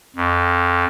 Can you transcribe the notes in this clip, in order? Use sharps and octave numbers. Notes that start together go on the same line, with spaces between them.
F2